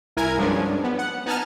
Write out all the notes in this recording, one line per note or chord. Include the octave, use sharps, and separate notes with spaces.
C2 E4 A#4 G#5 G#6
G2 F3 F#3 G#3 C#4 D4
B3
F#5
B3 D#4 G#5 A5 F6